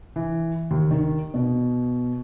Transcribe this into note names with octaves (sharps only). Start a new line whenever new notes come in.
E3
D#2
D#3
B2